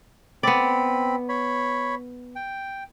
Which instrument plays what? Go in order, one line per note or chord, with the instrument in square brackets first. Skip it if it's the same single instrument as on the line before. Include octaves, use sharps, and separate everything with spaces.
[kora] B3 D5 [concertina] C4 B5
[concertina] C#5 B5
G5